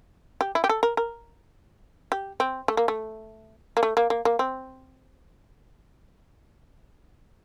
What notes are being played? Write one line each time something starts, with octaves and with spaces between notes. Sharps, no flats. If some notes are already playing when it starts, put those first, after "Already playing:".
G4
E4
G4
A4
A#4
A#4
G4
C4
A3
A#3
A3
A#3
A3
A#3
A#3
A#3
C4